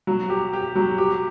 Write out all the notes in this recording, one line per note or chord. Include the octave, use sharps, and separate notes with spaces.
F#3
G4
G4
F#3
G4